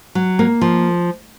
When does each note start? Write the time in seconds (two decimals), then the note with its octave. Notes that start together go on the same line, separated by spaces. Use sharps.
0.15 F#3
0.39 A#3
0.61 F3